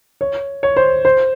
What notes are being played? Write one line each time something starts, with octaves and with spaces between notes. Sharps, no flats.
C#5
C#5
C5
C5